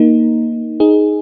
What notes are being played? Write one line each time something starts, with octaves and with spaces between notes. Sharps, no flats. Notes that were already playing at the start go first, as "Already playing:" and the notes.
Already playing: A#3 D#4
D#4 G#4